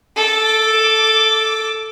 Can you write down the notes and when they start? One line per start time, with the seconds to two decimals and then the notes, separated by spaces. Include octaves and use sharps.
0.16 A4 D6